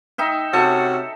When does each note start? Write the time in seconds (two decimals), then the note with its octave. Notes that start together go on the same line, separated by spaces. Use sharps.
0.18 D#4 E5 G5
0.53 C3 C#4 F#4 A4